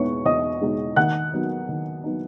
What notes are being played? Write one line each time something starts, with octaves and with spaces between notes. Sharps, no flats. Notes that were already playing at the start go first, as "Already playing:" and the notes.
Already playing: E2 B2 G#3 B3 D#4 C#5 C#6
E2 D#5 D#6
B2 G#3 B3 D#4
D#3 F#5 F#6
F#3 B3 D#4
D#3
F#3 B3 D#4